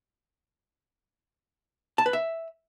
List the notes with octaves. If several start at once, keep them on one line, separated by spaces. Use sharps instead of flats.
A5
B4
E5